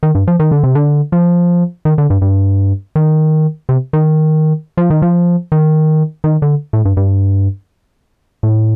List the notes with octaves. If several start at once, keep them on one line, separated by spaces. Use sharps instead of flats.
D#3
G2
F3
D#3
D3
C3
D3
F3
D#3
D3
G2
G2
D#3
C3
D#3
F3
D#3
F3
D#3
D#3
D3
A2
G2
G2
A2